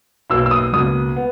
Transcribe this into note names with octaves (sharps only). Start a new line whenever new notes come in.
B1 B2 A#3 E6
E6
D#6
C#2 B2 A#3 D#6
B3